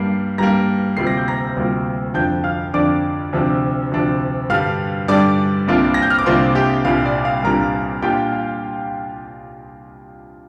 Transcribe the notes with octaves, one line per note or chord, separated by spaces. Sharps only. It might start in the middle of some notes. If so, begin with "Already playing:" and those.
Already playing: G2 G3 A#3 C7
G2 G3 A#3 A#5 A#6
D2 C3 G3 A#3 F4 C7
A#6
G6
A#5 A#6
D2 C3 G3 A#3 F4
F2 D3 F3 D4 G5 G6
F5 F6
F2 D3 F3 D4 D5 D6
D2 C3 F3 D4
D2 C3 F3 D4
G2 D3 G3 F5 F6
G2 D3 G3 D5 D6
C2 C3 A#3 D4 F4
A#6
G6
F6
D6
C2 C3 A#3 D4 F4 C5 C6
G4 G5
C2 A#2 G3 D4 F5
D5
F5
C2 A#2 G3 D4 A#4 A#5
A#2 A#3 D4 F4 G4 G5
F5